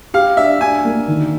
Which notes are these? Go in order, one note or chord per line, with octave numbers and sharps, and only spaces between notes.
G4 F5
D4 E5
D4 G#5
A#3
D#3